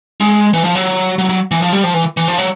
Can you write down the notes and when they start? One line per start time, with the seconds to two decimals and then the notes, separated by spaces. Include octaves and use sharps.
0.21 G#3
0.53 E3
0.64 F3
0.75 F#3
1.18 F#3
1.29 F#3
1.51 E3
1.62 F3
1.73 G3
1.84 F3
1.94 E3
2.17 E3
2.28 F3
2.38 F#3